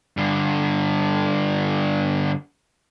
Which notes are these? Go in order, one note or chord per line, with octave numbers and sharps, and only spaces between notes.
G2 D3